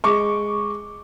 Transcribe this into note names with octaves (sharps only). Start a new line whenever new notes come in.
G#3 C#6 D6